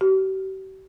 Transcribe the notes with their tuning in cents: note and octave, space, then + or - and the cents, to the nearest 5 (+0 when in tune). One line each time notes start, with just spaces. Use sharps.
G4 -45